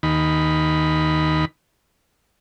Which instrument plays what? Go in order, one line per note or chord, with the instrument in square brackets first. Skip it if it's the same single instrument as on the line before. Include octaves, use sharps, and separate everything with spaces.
[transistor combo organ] D#2 D#3 B5